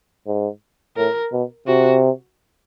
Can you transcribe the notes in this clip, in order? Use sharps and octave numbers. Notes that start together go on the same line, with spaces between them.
G#2
A2 A#4
B2
C3 F#4